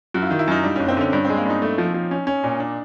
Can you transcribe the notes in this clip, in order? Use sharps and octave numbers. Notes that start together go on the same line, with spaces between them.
F#2 F#4
E4
D#3 F4
E4
F#2 D#4
G3 D4
F#1 C#4
C4
D3 C#4
G2 C#4
C4
G#3
A#3
G2 D#4
A3
F3
F3
C#4
C#4
A#2
D4